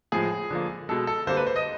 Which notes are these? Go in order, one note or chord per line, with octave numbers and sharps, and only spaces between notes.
A2 F3 G#3 G#4
D3 F3 A#3
B2 G#3 A4
A4
D3 G3 A#3 C5
B4
C5
D#5